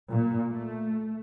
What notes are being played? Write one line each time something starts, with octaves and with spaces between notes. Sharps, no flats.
A#2
A3